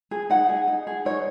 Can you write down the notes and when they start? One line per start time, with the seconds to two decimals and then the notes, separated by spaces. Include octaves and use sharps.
0.11 G#4
0.30 D#4 F#5
0.49 G#4
0.68 D#4
0.87 G#4
1.05 D#4 C#5